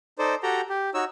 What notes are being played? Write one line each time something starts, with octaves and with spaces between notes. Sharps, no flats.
D#4 A4 C5 D5
F#4 G4 A4 G5 A#5
G4
D#4 F#4 C#5 E6